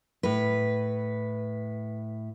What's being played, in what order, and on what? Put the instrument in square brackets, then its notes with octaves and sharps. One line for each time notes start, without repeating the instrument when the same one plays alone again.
[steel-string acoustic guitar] A2 B4